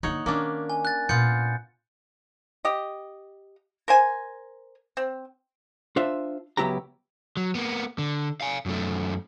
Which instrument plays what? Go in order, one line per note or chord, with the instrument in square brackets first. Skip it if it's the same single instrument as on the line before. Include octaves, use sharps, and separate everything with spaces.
[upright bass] D3 A#3 [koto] D#4 C#5 F#5
[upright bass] D#3 [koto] A#3 C#4 D4
[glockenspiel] G#5
F#6 A6
[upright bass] A#2 [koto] B3 F4 [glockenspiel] G6 C#7
[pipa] G4 D#5
A#4 C5 G#5
C4
[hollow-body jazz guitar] D4 F4 C5 E5
C#2 F#3 B3 E4 G4 A#5
[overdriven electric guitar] F#3
A#3 B3
D3
F5 G#5
F#2 A3